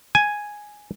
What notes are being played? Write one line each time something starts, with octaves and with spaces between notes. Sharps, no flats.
G#5